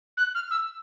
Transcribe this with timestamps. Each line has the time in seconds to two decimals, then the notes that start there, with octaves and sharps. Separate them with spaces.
0.17 F#6
0.35 F6
0.51 E6